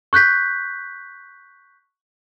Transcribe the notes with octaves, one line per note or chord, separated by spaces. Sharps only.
C#6 F#6 G6 B6